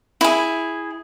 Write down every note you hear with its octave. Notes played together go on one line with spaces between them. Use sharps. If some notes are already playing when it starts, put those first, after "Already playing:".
E4 G#4